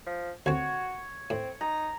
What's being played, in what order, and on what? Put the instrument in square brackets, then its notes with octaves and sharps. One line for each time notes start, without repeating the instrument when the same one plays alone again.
[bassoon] F3
[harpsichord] D2 C4 [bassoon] F#4 [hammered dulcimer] C#5
[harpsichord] A2 [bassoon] C4
[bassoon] D#4 [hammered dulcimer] A#5